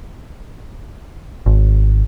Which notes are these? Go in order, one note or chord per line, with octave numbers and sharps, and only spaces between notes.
G#1